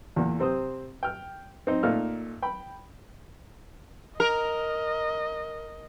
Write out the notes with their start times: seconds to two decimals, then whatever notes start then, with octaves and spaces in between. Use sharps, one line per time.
0.16 E2 A#2
0.39 C3 C4 C5 D#6
1.03 G5 F6
1.67 C4 D#4
1.83 A#2 A3 D#4 F5 F6
2.42 G5 B5
4.20 A#4 D#5